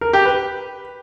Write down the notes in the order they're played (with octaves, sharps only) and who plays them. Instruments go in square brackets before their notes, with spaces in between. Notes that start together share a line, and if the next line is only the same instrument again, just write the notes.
[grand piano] A#4
G4
B4